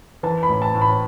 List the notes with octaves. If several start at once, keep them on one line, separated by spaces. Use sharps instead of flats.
E3 A5
B5
A1
A5
A2
B5